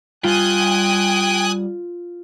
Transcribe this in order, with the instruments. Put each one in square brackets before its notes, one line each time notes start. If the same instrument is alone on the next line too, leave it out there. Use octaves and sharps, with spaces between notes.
[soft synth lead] G3 [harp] F4 [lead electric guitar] G5 [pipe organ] G#5 D#6 F#6